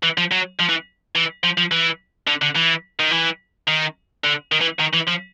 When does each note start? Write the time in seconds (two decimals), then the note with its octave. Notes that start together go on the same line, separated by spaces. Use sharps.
0.03 E3
0.18 F3
0.31 F#3
0.59 F3
0.69 E3
1.15 E3
1.44 F3
1.58 F3
1.71 E3
2.28 D3
2.42 D3
2.56 E3
3.00 D#3
3.11 E3
3.67 D#3
4.24 D3
4.52 D#3
4.61 E3
4.80 D#3
4.94 E3
5.08 F3